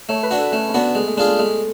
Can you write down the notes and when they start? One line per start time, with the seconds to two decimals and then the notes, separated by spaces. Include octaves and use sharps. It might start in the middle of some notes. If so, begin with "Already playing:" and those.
0.09 A3 C#5
0.23 B4
0.31 D4 F#4
0.38 A4
0.52 A3 C#4
0.69 C#4
0.74 B3 D4 F#4
0.95 G#3 A3
1.07 A3
1.17 G#3 D4 F4 G#4
1.28 A3
1.39 G#3 A3